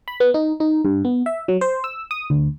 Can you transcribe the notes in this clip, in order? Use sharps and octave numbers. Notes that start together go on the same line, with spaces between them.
B5
B3
D#4
D#4
G2
B3
E5
F#3
C5
E6
D#6
D2